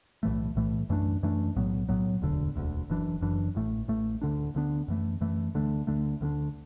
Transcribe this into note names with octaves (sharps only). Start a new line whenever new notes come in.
B1 A2 E3 A3
B1 A2 E3 A3
F#2 E3 A3 D4
F#2 E3 A3 D4
B1 A2 F#3 B3
B1 A2 F#3 B3
E1 D2 D3
E1 D2 D3
F#1 F#2 E3 D4
F#1 F#2 E3 D4
A1 A2 A3
A1 A2 A3
D2 D3 B3 D4
D2 D3 B3 D4
F#2 E3 A3
F#2 E3 A3
D2 D3 A3 D4
D2 D3 A3 D4
D2 D3 B3 D4